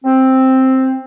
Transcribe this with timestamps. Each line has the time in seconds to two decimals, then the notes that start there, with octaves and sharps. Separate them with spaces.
0.05 C4